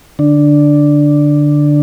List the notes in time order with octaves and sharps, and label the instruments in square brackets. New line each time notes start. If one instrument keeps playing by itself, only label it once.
[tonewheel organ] D3 D4